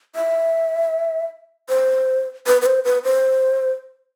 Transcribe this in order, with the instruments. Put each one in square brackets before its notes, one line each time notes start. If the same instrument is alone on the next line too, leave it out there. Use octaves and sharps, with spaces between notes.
[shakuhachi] E5
C5
B4
B4
C5
B4
C5